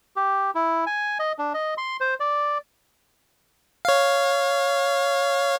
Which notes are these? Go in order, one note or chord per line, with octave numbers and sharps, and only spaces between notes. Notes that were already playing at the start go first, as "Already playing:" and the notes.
G4
E4
G#5
D#5
D4
D#5
C6
C5
D5
C#5 F5